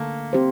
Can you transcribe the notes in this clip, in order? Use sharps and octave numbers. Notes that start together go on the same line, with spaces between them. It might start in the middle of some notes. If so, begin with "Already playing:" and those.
Already playing: D3 A3 A#3
C4 G4 C5